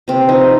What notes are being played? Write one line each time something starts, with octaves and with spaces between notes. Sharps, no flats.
C3 C4
F3 D#4